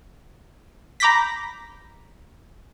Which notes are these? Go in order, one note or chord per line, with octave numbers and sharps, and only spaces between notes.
A#5 B5 D6 G6 A#6 B6